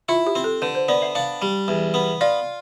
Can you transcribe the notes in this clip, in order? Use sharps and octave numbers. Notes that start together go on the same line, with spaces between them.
E4 F4
G4
C4
A4
D3 B4
C5
B3 D5
E5
D4 F5
G3
E2
B3
F4 D5